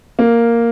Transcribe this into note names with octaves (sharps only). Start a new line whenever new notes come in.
A#3